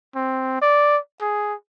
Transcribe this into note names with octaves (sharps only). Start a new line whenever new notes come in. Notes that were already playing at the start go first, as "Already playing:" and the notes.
C4
D5
G#4